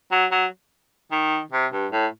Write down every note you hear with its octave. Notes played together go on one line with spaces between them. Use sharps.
F#3
F#3
D#3
C3
G2
A2